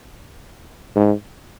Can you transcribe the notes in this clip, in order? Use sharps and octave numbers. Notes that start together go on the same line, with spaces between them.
G#2